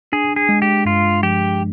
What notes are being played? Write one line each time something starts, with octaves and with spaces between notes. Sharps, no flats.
D4 G#4
G#4
G#3
G4
G2 F4
F3 G4